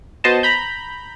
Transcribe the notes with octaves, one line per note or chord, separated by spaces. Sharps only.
B3 F#4 C5 D#5 A5
A#5 B5 G6